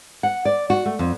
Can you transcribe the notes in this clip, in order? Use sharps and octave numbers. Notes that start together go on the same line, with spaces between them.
F#5
D5
F#4
A3
F2